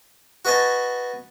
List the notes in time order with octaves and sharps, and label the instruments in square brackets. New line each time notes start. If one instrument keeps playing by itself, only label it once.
[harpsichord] F#4 B4 D#5 G#5 A5